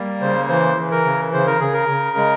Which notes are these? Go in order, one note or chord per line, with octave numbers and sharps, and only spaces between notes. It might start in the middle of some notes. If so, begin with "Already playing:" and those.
Already playing: G3 A#3
C#3 C5
E3 C5
E3
A#4
C#3
C#3 C5
A#4
C#3 G#4
A#4
C#3
G#3